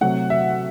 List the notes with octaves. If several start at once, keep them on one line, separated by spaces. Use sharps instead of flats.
C3 F#3 A3 F#5
E5